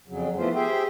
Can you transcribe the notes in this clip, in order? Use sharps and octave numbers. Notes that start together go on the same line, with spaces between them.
F2 C#3 F#3
E3 F3 A3 B3 F4 C5
G4 G#4 C5 E5 G5